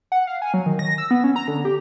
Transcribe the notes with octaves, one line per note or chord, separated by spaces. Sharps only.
F#5
F5
G#5
F#3
D#3
A#6
E6
B3
C#4
A#5
D3
G4